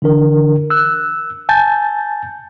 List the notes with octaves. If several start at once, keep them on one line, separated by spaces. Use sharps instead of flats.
D3 E3 D4 A#4
E6 F#6
G#5 A5 G6 A6